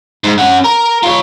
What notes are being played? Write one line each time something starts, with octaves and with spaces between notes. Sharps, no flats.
G#2
C#4 F#5
A#4
F4 C#5